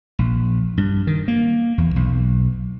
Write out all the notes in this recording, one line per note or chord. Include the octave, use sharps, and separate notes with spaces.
A#1
G2
D#3
A#3
E2
B1